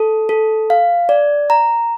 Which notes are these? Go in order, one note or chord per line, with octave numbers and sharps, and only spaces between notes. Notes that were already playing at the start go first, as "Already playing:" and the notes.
Already playing: A4
A4
F5
D5
A#5